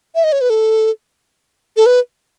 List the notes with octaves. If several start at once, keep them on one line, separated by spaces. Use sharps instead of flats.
E5
D#5
C#5
B4
A4
A4
B4